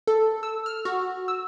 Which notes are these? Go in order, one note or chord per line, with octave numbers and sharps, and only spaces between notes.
A4
E6
F6
F#4
E6